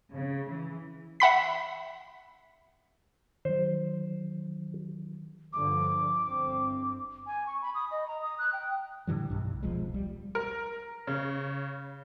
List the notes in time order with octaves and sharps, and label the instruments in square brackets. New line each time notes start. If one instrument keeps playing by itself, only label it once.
[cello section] C#3
E3
[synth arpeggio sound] E5 F#5 B5 B6
[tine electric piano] D#3 F#3 [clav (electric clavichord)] C5
[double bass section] G2 D3 F3 [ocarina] D6
[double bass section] G1 C4
[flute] G#5
C#6
B5
D#6
D#5
A#5
D#6
F#6
G5
[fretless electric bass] A2 D3 E3 G3
B1 G2
D#1 B1 F3 G#3
G3
[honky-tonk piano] A#4
C#3